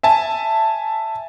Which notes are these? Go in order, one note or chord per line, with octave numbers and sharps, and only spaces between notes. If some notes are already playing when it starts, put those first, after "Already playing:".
E5 G#5 A5